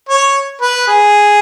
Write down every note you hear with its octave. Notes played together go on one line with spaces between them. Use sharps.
C#5
B4
G#4